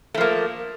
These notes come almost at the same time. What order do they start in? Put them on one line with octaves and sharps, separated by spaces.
A3 F3 A#3